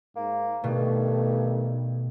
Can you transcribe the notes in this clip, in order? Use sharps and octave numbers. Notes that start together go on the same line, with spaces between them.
G#2 A#3
G2 B2 D#3 A3